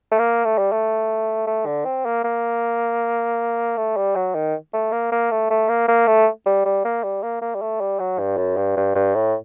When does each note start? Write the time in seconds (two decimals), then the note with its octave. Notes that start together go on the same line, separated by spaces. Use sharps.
0.12 A3
0.19 A#3
0.45 A3
0.58 G3
0.72 A3
1.47 A3
1.66 D3
1.85 C4
2.05 A#3
2.24 A#3
3.77 A3
3.97 G3
4.16 F#3
4.35 D#3
4.73 A3
4.92 A#3
5.12 A#3
5.31 A3
5.50 A3
5.69 A#3
5.88 A#3
6.07 A3
6.46 G3
6.65 G3
6.85 A#3
7.04 G3
7.23 A#3
7.42 A#3
7.55 G3
7.62 A3
7.81 G3
8.00 F#3
8.19 G2
8.38 F#2
8.57 G2
8.77 G2
8.95 G2
9.15 A2